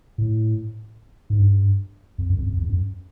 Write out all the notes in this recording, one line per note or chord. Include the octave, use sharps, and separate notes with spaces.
A2
G#2
G2
F2
F#2
F2
F2
E2
F#2